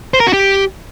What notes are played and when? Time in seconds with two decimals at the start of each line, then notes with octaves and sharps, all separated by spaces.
0.14 C5
0.20 A#4
0.27 F#4
0.33 G4